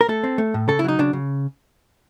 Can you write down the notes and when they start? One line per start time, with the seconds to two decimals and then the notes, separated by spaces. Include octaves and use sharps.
0.01 A#4
0.09 A3 A4
0.24 C4
0.38 A3
0.54 A2
0.68 C#3 A4
0.79 E4
0.84 F#3 D#4
0.99 C#3 D4
1.13 C#3